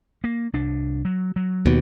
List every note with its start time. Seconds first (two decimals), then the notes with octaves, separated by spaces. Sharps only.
0.24 A#3
0.53 C2 D4
1.05 F#3
1.36 F#3
1.66 D#2 B2